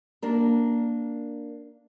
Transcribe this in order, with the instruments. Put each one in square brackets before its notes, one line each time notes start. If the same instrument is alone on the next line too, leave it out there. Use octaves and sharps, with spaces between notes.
[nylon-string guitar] A#3 D4 A#4